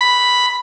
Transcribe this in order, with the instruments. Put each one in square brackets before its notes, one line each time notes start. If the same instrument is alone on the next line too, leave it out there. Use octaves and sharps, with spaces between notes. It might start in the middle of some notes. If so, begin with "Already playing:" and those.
[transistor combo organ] B5